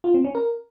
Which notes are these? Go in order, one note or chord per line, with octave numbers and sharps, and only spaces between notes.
F4
C4
C#4
A#4